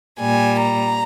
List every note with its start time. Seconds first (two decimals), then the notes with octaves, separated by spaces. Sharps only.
0.20 A#2 G3 G#5
0.63 A#5